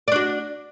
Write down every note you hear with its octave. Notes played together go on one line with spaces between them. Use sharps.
D4 F#4 D5